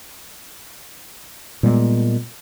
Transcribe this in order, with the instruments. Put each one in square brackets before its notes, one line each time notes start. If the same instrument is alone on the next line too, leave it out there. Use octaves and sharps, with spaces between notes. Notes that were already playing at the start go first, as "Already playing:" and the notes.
[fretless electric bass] A#2 G3 G#3 B3